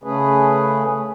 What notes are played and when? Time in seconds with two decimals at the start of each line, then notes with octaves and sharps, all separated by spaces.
0.04 C#3 A3 C#4 G#4 B4